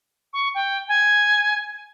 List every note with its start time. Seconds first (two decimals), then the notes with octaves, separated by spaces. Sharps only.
0.33 C#6
0.54 G5
0.88 G#5